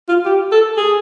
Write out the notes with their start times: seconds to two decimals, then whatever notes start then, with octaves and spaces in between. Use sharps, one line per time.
0.09 F4
0.25 G4
0.52 A4
0.77 G#4